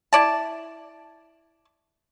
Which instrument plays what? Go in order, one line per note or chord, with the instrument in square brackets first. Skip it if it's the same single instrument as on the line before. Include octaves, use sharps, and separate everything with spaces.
[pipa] E4 D5 A5